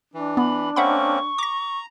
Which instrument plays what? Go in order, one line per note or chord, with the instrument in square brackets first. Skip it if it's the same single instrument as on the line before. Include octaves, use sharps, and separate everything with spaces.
[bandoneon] E3 [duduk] D4
[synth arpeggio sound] B3 [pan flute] B5
[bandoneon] A#3 C4 C#4 [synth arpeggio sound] E5 F#5 B5 [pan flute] C#6
[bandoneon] A#5 [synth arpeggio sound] D6 A#6